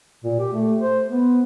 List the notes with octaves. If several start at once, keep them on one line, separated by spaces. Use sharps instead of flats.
A#2
G4
A3
C5
B3